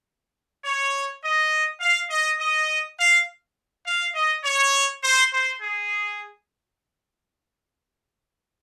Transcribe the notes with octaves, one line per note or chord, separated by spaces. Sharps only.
C#5
D#5
F5
D#5
D#5
F5
F5
D#5
C#5
C5
C5
G#4